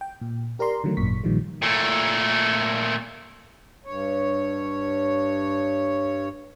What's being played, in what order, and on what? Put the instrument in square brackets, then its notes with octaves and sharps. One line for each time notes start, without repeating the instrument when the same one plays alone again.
[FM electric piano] G5
A#2
G4 A#4 D5 A#5 C6
D3 D#3 F#3 A3
G#1 F#2 A#2 C#6 B6
A#1 A#2 D#3 F3 G3
[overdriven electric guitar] A#2 A3
[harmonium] G2 C#5